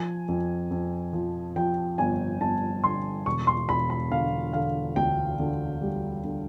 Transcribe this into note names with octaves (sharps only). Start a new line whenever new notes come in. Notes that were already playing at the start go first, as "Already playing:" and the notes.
Already playing: F3 G#5
F2
F2
F3
F3 G5
G1 G#5
G1 A5
D3 C6
E1 C#6
C6
E1 B5
B5
D3 F5
D3 F5
D2 G5
D3
G3
D3